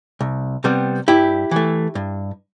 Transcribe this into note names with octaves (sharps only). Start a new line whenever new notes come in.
C2
C3 G3 B3
G2 E4 G4
E3 A3
G2